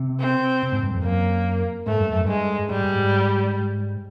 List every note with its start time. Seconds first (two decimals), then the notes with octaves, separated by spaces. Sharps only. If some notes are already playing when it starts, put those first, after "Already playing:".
Already playing: C3
0.20 C4
0.63 C3
0.72 G#2
0.82 G2
0.94 F2
1.04 F#2 A#3
1.86 G#2 A3
2.00 G2
2.12 F#2
2.24 G2 G#3
2.70 G#2 G3
2.84 G2
2.98 G#2